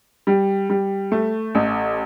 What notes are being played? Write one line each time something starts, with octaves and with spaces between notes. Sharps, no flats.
G3
G3
A3
A1